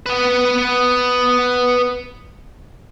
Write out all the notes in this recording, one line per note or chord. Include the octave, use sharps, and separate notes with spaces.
B3 B4